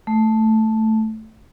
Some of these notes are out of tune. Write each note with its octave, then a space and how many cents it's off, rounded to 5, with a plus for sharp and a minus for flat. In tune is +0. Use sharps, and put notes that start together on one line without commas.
A3 +0